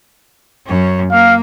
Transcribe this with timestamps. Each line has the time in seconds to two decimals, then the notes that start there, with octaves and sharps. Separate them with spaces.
0.67 F#2 C#4
1.11 A#3 F5